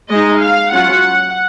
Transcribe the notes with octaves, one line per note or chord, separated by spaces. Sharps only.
G#3 D#4 D#5
F5
F#3 C#4 F4 F#5